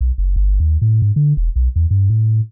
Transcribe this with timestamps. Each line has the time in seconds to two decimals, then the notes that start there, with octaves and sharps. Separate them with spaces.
0.01 B1
0.18 F#1
0.36 G1
0.60 D#2
0.82 A2
1.02 G#2
1.16 D3
1.37 E1
1.56 B1
1.76 E2
1.91 G2
2.10 A2